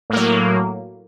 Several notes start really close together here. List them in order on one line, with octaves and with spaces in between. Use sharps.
A2 A#3 F#3